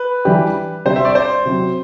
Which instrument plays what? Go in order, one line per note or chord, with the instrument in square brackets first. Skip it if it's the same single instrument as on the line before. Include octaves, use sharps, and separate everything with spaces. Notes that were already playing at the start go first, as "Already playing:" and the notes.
Already playing: [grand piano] B4
[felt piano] E3 G3 D4 G4
[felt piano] C3 G3 D4 G4 [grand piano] C5
[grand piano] E5
D5
C5
[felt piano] C3 F#3 C4